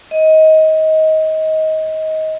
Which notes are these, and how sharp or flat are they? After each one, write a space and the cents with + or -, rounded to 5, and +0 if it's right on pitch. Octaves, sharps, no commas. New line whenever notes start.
D#5 +20